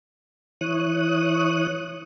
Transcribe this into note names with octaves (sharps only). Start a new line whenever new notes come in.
E3 C#5 D#6 F#6